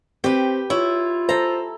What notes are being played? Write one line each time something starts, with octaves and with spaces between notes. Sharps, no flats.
C4 G4 B4
E4 F4 C#5
A4 C5 A#5